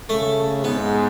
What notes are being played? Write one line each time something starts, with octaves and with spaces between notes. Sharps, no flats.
C#3 A3
G#2 B3